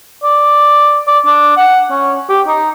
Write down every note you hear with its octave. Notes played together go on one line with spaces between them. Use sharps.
D5
D5
D4
F#5
C#4
G4
D#4